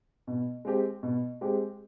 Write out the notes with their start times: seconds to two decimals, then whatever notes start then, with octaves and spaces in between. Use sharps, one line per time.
0.27 B2
0.65 G#3 C4 G4
1.03 B2
1.41 G#3 C4 G4